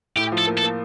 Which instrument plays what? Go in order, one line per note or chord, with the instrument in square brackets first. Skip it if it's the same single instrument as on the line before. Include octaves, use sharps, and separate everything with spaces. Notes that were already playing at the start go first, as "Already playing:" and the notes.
[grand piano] A2 [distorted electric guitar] G4
[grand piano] F3
[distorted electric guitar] A4
[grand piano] A#3
[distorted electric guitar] A4
[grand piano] A#3